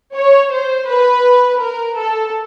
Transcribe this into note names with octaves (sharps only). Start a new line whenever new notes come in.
C#5
C5
B4
A#4
A4